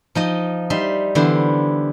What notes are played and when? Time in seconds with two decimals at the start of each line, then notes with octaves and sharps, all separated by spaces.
0.15 F3 D#4 D#5
0.70 G3 D#4 E5 C6
1.15 D3 E3 B3 E4 C5